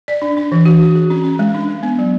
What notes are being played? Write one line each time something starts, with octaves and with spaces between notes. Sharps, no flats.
D5
D4
D4
E3
F#4
F#4
G#4
C#4
C#4
G#3
D4
G#3
B3
F#3